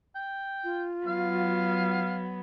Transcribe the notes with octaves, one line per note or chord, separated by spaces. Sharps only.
G5
F4
F#3 B3 F5